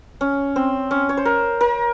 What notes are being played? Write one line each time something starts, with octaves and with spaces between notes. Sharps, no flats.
C#4
C4
C#4
C#5
C5
A#4
A#4